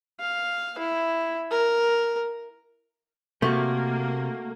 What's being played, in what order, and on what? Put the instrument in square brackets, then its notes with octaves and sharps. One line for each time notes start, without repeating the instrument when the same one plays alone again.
[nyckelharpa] F5
E4
A#4
[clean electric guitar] C3 [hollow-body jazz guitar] A3 F#4 [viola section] A#3